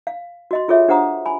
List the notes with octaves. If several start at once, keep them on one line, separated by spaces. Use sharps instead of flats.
F5
F#4 D#5 C6
F4 G#4 A4 C#5 E5
D4 G4 C5 F#5 A#5 D#6
G#5 B5